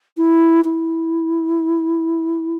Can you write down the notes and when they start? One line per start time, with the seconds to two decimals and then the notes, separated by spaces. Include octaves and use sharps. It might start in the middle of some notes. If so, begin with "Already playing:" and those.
0.17 E4
0.65 E4